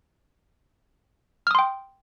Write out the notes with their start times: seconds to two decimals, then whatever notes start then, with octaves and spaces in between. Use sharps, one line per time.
1.47 F6
1.51 D#6
1.55 C6
1.59 G5